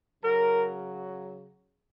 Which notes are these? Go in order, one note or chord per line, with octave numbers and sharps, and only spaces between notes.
C#3 F#3 A#4